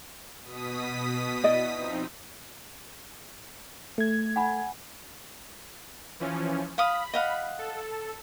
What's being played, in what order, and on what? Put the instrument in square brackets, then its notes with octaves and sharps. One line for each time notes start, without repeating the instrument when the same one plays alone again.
[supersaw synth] B2 D#6 B6
[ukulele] E4 D5 D#5
[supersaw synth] F3 C4 D#4
[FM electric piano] A3 G#6
[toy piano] F#5 G#5 B5
[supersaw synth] E3 F3 C#4
[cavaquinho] F5 D#6 [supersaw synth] B5
[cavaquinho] D#5 F5 F#5
[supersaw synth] A4